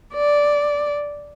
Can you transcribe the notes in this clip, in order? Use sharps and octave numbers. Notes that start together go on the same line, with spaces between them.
D5